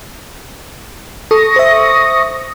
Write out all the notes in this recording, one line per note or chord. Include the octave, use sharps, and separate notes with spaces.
A4 C#6 D#6 A#6
C5 E5